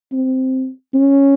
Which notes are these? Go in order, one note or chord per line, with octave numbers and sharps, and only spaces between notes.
C4
C#4